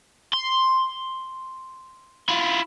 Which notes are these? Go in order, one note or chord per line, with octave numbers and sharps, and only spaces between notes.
C6
E4 F4